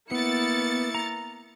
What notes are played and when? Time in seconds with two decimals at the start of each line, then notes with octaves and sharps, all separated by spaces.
0.11 A#3 B3 E4 A6 C#7
0.95 A#5